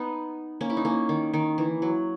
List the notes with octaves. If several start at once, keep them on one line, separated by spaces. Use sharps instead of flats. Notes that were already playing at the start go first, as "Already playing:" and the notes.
Already playing: B3 D#4
A#3 C#4
E4
D#4
A#3 C#4
D#3
D#3
E3
F#3